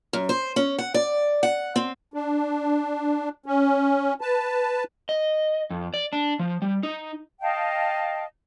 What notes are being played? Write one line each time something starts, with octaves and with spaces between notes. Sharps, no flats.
F#2
C5
C#4
F#5
D5
F#5
C4
D4
C#4
B4 A5
D#5
F2
D5
D4
F3
G3
D#4
D#5 F5 G5 A5